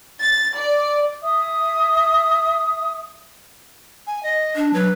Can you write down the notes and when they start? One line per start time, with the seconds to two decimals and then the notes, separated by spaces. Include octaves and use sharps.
0.21 A6
0.57 D5
1.23 E5 D#6
4.07 G#5
4.23 D#5
4.56 D4
4.74 F#3 B4